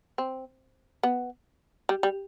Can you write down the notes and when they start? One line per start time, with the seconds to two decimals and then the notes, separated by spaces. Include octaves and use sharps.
0.18 C4
1.03 B3
1.89 G3
2.03 G3